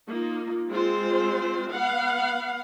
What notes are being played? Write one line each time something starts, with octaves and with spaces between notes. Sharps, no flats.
A#3 D#4 F4
G#3 C4 F4 C5
B3 F5 F#5